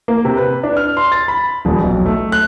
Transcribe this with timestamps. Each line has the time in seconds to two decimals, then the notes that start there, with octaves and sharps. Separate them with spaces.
0.08 A#3
0.25 C3
0.37 B4
0.64 D4
0.77 F6
0.97 C6
1.12 A6
1.28 B5
1.65 D#1
1.84 B1
2.06 A3
2.32 F#6